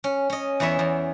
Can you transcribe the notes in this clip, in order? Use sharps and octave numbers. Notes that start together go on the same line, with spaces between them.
C#4
C#4 D#5
E2 E3 B3 C#5 E5
E2